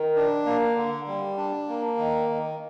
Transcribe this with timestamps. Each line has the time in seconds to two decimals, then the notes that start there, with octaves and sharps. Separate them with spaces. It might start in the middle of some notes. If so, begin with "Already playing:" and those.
Already playing: D#3
0.16 D4
0.46 A#3
0.76 D3
1.08 G3
1.37 D4
1.68 A#3
1.98 D#3
2.29 D#3